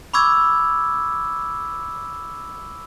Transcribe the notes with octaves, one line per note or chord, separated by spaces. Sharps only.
B5 C#6 D6 E6 G#6